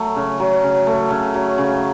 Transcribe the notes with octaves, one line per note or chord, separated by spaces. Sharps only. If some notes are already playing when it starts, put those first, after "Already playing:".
Already playing: F#3 A3
C#3
F#3
C#3
A3
C#3
F#3
C#3